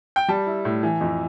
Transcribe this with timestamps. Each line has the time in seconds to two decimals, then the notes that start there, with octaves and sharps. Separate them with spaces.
0.16 G5
0.28 G3 A5
0.46 E4
0.65 A2
0.83 E3
1.01 F2